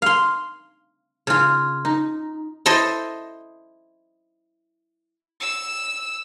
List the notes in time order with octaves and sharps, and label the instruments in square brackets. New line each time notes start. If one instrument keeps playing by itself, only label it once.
[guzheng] F5 C6
C#3 F4
D#4
E4 A4 C5 D#5
[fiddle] E6